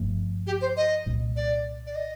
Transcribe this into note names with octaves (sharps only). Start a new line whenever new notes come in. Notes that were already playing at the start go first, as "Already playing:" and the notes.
Already playing: G1 G2 F3 A3
G4
C5
D#5
C2 A#2 G3
D5
D5
D#5